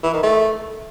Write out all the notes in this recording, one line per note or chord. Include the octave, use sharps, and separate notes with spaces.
E3
D#3
A3